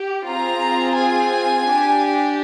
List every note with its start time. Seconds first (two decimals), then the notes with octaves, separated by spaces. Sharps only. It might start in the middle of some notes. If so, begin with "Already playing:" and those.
Already playing: G4
0.28 C4 F4 G#4 A#5
0.98 G#5
1.67 D4 G4